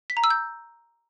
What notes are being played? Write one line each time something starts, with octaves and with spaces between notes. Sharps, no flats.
B6
A#5
E6
G6